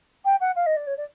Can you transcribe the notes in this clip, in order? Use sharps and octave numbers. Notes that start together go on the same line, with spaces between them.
G5
F#5
F5
D#5
D5
C#5
D5